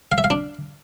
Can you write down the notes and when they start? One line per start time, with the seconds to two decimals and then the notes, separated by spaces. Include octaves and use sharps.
0.12 F5
0.18 E5
0.24 F5
0.30 D4